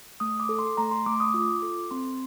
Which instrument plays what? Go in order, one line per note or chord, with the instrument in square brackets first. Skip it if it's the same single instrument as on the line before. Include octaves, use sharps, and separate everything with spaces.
[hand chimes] A3 D#6
D6
A4
C6
A3 A#5
C6
A3 D6
D#6
F4 D6
A4
C4 C6